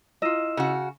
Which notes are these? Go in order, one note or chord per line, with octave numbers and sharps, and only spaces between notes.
E4 F4 D#5 E6 E7
C#3 F#4